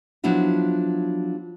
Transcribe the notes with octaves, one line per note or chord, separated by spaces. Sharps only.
F3 F#3 B3 D4 E4 F4